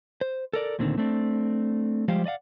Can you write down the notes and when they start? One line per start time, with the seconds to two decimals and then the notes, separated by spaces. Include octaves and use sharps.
0.21 C5
0.53 A4 A#4 D5
0.79 D2 A#2 D3 D#3 C4
0.98 A3 C4 D4
2.08 F3 G3 G#3 G4 C5 F5
2.26 D5 D#5 F5 F#5